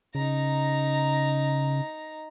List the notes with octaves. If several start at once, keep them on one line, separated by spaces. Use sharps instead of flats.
C#3 D#4 A#5